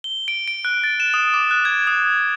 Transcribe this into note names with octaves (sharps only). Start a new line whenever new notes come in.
G7
D7
D7
F#6
A6
E7
D#6
D6
F#6
G#6
D#6